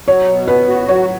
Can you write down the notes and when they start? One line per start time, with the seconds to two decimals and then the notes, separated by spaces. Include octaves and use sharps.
0.07 F#3 C#5
0.28 B2
0.48 B3 B4
0.68 F#4
0.88 F#3 C#5